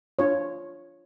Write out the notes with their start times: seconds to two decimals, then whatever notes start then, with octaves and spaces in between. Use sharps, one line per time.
0.19 D4 F4 C#5